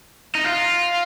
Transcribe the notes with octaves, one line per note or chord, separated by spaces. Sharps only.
D#4
F4